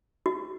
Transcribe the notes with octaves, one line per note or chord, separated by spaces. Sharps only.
F#4